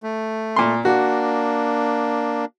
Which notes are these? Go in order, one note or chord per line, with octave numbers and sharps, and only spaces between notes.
A3
A#2 C6
A#3 D4 F#4